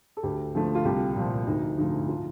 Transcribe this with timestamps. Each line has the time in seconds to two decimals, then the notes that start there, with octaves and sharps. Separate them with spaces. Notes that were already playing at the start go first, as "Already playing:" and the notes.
0.17 A4
0.23 D2 G4
0.54 D3 F3 A3
0.75 F4
0.85 C2 G4
1.16 A#2 F3
1.47 D2 D#4
1.78 D3 F3 A3 D#4
2.09 F4